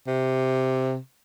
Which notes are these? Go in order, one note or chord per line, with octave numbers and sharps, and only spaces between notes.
C3